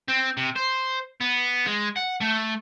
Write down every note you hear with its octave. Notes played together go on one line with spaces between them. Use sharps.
C4
C3
C5
B3
G#3
F#5
A3